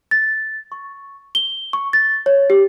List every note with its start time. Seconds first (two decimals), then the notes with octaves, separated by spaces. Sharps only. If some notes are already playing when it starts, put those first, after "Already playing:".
0.11 A6
0.72 C#6
1.35 G7
1.73 C#6
1.93 A6
2.26 C#5
2.50 G4